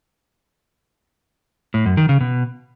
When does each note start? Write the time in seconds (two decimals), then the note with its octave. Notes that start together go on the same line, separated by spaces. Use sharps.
1.74 A2
1.86 F#2
1.97 D#3
2.09 C#3
2.21 B2